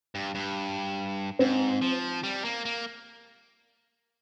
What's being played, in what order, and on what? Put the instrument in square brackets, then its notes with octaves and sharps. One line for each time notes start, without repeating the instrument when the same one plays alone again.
[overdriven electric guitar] G2
G2
[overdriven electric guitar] G#2 [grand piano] C4
[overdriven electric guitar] F3
G3
A#3
A#3